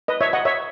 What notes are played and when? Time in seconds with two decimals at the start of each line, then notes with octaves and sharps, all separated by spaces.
0.08 B4 D#5
0.21 C#5 E5
0.33 D#5 F#5
0.45 C#5 E5